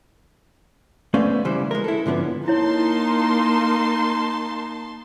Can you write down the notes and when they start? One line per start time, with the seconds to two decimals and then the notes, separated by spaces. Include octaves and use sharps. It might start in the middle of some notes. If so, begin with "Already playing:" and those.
1.14 A3 B3 C#4 C5 D5 F5
1.45 C#3 E3 G3 E4 C5
1.71 G#3 A#4
1.84 E4 A4
2.06 G#2 D3 F3 B3 C#4
2.48 A#3 D#4 E4 C#5 A5 C6